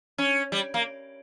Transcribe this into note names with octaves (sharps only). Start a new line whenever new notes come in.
C#4
G3
A#3